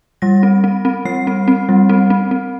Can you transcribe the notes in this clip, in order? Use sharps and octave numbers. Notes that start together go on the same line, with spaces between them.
G3 A#6
C4
C4
C4
G3 C7
C4
C4
G3
C4
C4
C4